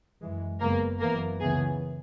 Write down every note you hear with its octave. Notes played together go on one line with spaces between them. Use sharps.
F#2 E3 G#3
F#1 F#2 C#3 G#3 A#3 B3 A#4
F#2 E3 A#3 B3 A#4
C#2 C#3 E3 B3 G#4